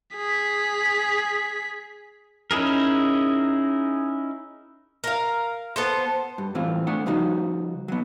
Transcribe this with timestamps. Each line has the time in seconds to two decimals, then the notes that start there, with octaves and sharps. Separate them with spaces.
0.16 G#4 B6
2.51 C#4 D#4 E4 G#4 A#4
5.04 A#4 F5
5.76 B3 A4 C5
6.38 G2
6.55 A2 E3 C4 F4
6.87 A3 D4 F#5
7.06 C#3 F3 G3 D#4 F#4
7.88 F#3 B3